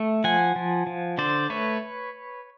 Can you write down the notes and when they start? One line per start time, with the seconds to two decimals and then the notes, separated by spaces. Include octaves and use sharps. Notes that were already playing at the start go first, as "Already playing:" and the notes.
Already playing: A3
0.24 F3 F#5 G#5
0.56 F3
0.87 F3
1.18 D3 C5 D5
1.50 A3 B4 C#5